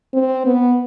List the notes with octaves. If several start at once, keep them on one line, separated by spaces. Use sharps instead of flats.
C4
B3